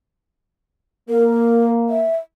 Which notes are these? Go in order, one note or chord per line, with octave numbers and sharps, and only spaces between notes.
A#3 A#4
E5